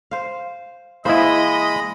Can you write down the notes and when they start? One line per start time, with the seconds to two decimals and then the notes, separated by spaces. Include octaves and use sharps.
0.11 C5 F5
1.05 E3 G#3 A#3 E4 C5 D#5 E5 B5